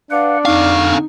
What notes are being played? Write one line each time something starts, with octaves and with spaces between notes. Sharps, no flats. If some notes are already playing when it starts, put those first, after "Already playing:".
D4 B4 F5 F#5
F2 D3 D#4 F5 C#6 F6